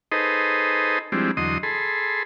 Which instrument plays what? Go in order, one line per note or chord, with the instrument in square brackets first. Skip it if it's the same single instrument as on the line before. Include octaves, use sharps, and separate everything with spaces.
[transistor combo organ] D#4 G#4 A4 B4 C5 D#5
F3 G3 G#3 C4 D4 E4
E2 D3 F#3 D#5 C6 D#6
G#4 A4 B5 C6